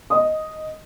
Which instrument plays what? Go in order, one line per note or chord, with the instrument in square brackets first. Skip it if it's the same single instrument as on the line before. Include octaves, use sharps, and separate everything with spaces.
[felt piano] D#5 D#6